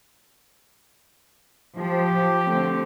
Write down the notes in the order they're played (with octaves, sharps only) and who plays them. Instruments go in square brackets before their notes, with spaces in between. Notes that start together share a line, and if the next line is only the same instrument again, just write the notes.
[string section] F3 [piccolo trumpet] G4
[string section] D3 A3 C4